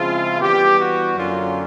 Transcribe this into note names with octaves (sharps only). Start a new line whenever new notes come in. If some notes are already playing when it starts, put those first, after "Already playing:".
Already playing: C#3 F3 G#3 C4 E4 F4
E3 G3 B3 G4
F#4
F#2 D3 F#3 A#3 C#4 F4